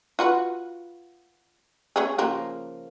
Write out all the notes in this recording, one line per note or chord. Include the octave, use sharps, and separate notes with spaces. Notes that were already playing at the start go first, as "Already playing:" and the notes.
F4 F#4 B4
A3 C#4 G#4
C#3 F3 A#3